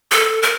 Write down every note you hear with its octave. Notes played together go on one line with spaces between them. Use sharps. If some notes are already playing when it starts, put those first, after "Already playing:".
A4
A#4